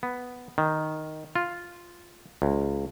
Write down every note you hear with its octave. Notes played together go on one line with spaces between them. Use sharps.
B3
D#3
F4
C#2